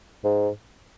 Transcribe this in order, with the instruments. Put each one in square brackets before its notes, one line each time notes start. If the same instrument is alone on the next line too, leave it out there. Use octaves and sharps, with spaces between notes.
[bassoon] G#2